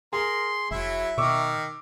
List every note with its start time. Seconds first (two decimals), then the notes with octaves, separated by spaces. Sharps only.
0.13 G#4 A#4 C6
0.71 F1 F#3 E4 E5
1.18 B2 D#3 C#6 D6 E6